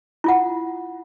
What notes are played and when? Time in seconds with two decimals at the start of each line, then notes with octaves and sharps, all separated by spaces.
0.24 E4 F4 F#5